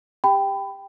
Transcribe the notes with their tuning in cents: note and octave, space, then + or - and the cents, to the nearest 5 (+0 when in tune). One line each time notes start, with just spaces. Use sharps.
G4 +15 G5 +0 B5 +20